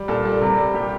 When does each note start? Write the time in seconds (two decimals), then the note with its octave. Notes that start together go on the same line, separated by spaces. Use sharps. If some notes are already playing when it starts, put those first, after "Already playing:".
Already playing: G3
0.08 A#2 A4
0.25 G3
0.41 C3
0.57 G3
0.74 A#2 G4